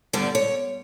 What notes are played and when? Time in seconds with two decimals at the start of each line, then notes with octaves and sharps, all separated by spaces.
0.13 G2 D3 G3 B3 D5
0.35 C#5